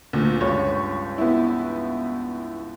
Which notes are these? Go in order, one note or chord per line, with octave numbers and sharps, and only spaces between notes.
D2 A#2
C#2 G2 C#5
B3 E4